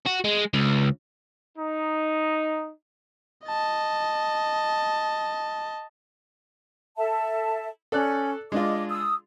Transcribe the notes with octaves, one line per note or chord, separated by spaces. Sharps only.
F#4
G#3
C#2
D#4
D#5 A5
A4 E5 A5
C#4 A4 D5 F#6
G#3 D4 F4 D#5 D6
D#6 E6